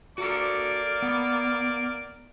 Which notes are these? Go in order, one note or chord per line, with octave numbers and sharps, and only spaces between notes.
A#3 F#4 A4 D5 D6
B3